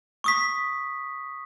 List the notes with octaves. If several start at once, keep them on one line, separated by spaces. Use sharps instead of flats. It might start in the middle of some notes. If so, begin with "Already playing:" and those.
C#6 D#6 B6